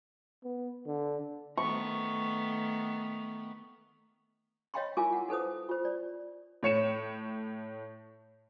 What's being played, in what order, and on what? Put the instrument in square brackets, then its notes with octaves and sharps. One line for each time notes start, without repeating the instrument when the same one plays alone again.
[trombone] B3
D3
[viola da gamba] D#3 A3 B3 [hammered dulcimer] C#6
[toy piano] C#5 D#5 F5 G5 B5 C6
E4 F4 A#4 F5 G#5 D6
F#5
D#4 A4 B4 C5 D#6
F4 C5
D5
[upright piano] A2 C#5 C#7 E7